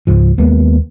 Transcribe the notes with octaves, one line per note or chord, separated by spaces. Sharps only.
C#2 G#2 F3
D#2 G#3 A#3 B3